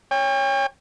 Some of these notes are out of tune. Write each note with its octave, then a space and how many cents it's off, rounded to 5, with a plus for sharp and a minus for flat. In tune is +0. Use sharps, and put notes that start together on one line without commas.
C#5 +0 G5 +45